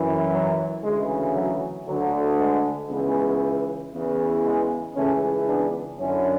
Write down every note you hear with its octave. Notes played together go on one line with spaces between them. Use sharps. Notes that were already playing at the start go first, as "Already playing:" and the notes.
Already playing: F#2 E3
F#3
D2 C#3 E3 G#3
F#3
D2 D3 F#3
G#3
C#2 C#3 E3 G#3 B3
E2 C#3 E3
G#3 B3
C#2 C#3 E3 A3 C#4
B3 D4
F#2 D3 C#4 E4